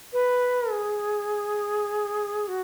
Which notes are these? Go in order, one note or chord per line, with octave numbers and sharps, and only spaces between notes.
B4
G#4
F#4